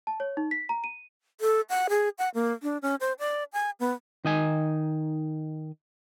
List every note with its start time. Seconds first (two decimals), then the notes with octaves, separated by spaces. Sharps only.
0.07 A5
0.20 C#5
0.37 D#4
0.51 B6
0.69 A#5
0.84 D#7
1.41 A4
1.70 F#5
1.89 G#4
2.18 F#5
2.35 A#3
2.63 D4
2.82 C#4
3.01 C5
3.19 D5
3.53 G#5
3.80 B3
4.25 D#3 D#4 G#5